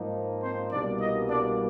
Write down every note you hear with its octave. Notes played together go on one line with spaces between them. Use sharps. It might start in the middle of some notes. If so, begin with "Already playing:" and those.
Already playing: G#2 F3 A#3 D#4
C4 C5
C2 B2 G3 A#3 D4 D5
D#4 D#5
D4 D5